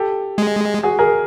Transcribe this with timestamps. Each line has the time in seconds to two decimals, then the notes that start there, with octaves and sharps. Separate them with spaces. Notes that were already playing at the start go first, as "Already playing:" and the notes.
Already playing: G4 A4
0.38 G#3
0.83 F#4 G#4
0.99 G#4 A#4